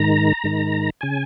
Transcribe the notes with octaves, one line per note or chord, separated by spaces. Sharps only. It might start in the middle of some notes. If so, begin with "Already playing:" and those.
Already playing: G#2 D#3 A#5
G#2 D#3
C#3 G#5